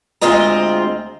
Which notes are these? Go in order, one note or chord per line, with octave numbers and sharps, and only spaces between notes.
D2 G#3 C4 F4 D#5 A#5